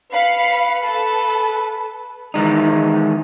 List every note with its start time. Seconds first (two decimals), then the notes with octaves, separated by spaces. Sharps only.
0.12 B4 F5 B5 C#7
0.85 A4
2.34 D#3 E3 G#3 D#4